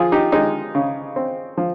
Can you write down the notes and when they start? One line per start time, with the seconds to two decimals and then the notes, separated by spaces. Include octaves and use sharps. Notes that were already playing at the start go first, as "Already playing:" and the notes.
Already playing: F3 F4 G#4
0.12 D#4 G4
0.32 G#3 D#4 G4
0.75 C#3
1.16 C4
1.57 F3